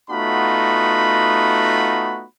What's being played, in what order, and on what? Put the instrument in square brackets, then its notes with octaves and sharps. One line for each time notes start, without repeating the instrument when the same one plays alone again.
[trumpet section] A3 B3 D#4 F4 F#4 B5